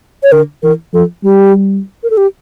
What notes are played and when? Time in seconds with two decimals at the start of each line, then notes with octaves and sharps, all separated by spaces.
0.23 C#5
0.32 D3 A#4
0.63 E3 A#4
0.94 F3 A4
1.24 G3 G4
2.03 A#4
2.10 A4
2.17 G4